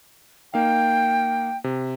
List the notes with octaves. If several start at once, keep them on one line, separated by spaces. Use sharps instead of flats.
A#3 D#4 F5 G5
C3